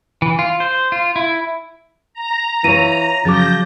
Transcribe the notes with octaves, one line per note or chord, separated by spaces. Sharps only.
E3
F4
C5
F4
E4
A#5
E3 F4 C#5 D#7
C#3 F3 F#3 D6 G6 A6 A#6